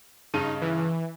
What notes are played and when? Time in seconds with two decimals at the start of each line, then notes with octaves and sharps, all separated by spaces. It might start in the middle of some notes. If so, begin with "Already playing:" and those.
0.34 G2 C#3 D#4 D#7
0.61 E3